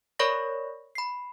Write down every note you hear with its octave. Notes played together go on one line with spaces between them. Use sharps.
A#4 C#5 D5 B5 C#6 A#6
B5 C7